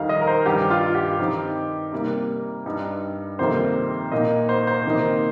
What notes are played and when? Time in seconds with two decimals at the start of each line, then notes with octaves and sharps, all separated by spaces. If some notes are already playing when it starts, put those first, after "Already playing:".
Already playing: F2 D#3 G3 D#4 F5
0.09 D#5
0.21 A#4
0.27 C5
0.46 G2 D#3 G3 D#4 G4
0.70 F4
0.95 G4
1.19 D#3 C4 D#4
1.92 C3 G3 A#3
2.66 G2 G3 D#4
3.39 F2 C3 D#3 G3 A#3 C5
4.12 A#2 A#3 D#4 D#5
4.49 C5
4.67 C5
4.85 C3 D#3 A#3 D#4